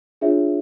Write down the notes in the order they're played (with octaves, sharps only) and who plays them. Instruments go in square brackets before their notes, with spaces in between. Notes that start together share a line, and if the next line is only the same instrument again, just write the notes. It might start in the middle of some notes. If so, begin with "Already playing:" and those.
[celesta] D4 F4 G#4 C#5 E5